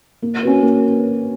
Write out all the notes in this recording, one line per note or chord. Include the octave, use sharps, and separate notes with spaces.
A#3
C#4 F#4 B4
A#3